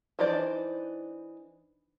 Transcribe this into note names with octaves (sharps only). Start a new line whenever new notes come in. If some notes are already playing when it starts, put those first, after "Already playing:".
E3 D4 D#4 C5 D5